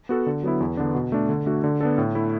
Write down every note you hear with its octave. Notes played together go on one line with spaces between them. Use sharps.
B3 F#4 A4
D3
F#3 B3 E4
E2
D3 B3 D4
B2
A3 D4
D3
A3 D4 F#4
D3
B3 D4 A4
A2
A3 E4